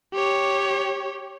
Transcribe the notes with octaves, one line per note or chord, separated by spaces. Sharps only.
G4 C#5